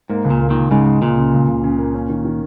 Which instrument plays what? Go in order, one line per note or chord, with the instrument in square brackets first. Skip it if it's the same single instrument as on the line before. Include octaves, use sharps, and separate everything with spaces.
[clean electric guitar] G#2 [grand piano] A#3
[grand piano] C#2
[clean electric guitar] A#2
[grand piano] A#3
[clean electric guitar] A#2 D#3
[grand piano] C#2
[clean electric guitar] G#2 C#3 [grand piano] G#3
[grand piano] G#3
[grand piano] C#2 [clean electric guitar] A#2
[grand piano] C#3
C#2
C#2
C#3
A#3
C#4
D#3
D#3